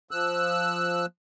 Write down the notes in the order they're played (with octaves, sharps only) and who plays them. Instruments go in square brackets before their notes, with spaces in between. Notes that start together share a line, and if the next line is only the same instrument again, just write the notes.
[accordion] F3 E6 F#6